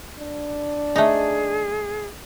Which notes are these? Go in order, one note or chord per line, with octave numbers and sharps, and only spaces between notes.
D4
A3 D#4 G#4